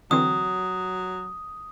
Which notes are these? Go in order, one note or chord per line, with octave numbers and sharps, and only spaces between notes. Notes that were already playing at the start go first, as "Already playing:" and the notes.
D3 E3 F#3 C4 D#6